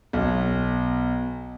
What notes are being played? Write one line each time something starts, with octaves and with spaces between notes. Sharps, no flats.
B1